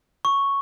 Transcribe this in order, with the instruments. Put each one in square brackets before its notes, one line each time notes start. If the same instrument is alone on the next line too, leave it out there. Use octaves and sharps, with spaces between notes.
[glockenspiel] C#6